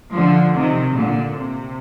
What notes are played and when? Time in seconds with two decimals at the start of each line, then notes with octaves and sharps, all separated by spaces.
0.15 D3 F3
0.55 C3 D#3
0.94 A#2 D3
1.35 C3